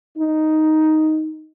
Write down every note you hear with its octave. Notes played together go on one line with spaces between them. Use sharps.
D#4